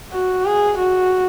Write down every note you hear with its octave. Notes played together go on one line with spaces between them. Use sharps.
F#4
G#4
F#4